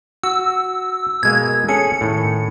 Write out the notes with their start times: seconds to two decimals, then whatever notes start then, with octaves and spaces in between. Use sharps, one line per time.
0.23 F#4 E6
1.23 B2 G#3 A#3 G#6
1.68 C#4 G#4 A4 C#7
2.01 A2 D#3